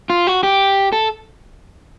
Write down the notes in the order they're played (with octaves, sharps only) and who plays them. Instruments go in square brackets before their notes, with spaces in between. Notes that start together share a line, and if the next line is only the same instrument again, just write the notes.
[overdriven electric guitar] F4
F#4
G4
A4